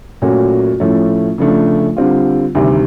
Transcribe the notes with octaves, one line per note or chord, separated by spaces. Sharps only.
A#2 F#3 A3 C#4 F#4
A2 F3 A3 C#4
C#3 F3 A3 D4
D3 G3 C4 F4
D2 C3 D#3 G3